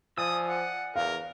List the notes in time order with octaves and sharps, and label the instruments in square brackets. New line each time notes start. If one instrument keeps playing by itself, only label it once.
[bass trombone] F3 [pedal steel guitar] D5 G#5 E6 [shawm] D#6
[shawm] F#5
[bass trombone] E2 [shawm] A#4 [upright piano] F5